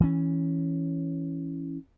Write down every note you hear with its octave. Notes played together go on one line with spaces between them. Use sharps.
E3 C#4